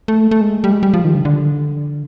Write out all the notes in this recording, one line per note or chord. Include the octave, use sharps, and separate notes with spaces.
A3
A3
G#3
G3
G#3
G3
F3
D#3
D3
D3